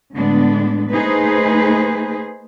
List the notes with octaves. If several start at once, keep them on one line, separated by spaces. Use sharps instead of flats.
A2 D3 G#3 B3 D4
A3 A#3 D#4 G#4 B4 C5